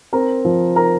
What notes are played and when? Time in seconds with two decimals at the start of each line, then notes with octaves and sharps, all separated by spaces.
0.13 C4 A#4 A#5
0.45 F3
0.76 A#4 A#5